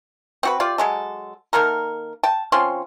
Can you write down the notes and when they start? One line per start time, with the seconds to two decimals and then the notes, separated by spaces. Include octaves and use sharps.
0.43 C4 F#4 B4
0.60 F4 G4 D5
0.78 F#3 G#3 A4
1.53 D#3 A#3 A4 A#4
2.23 G5 A5
2.52 F3 C4 C#4 C6